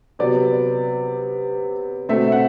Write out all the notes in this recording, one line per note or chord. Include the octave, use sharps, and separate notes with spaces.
C3 F#3 B3 D5
B2 A3 C4 E5
E5
F#5